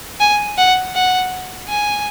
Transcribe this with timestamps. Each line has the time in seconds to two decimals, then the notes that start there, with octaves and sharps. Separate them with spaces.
0.20 G#5
0.58 F#5
0.95 F#5
1.69 G#5